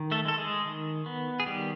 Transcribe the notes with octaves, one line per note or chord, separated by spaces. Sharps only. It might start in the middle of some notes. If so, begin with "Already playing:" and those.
Already playing: D#3
A3 A4
G#3 A4
G#3 G#4
D#3
B3
G#4
D#3 G3 G4